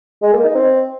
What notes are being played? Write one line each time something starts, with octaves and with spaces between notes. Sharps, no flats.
G#3
A#3
D#4
C4